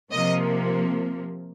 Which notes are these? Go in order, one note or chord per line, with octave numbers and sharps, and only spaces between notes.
C3 F3 A#3 D#5